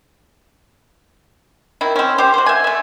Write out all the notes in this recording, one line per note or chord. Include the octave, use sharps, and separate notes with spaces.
D#3 E4
C4 C#4
G4 C5
F#4 C5
E5 G#5
A3 E5